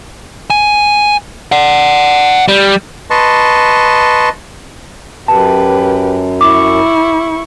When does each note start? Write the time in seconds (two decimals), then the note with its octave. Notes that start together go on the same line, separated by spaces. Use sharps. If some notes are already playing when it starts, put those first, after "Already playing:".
0.50 G#5
1.52 D5 F#5
2.48 G3
3.10 B4 D#5 A5 C6 C#6
5.28 F#2 G4 B4 A5
6.41 E4 C#6 D6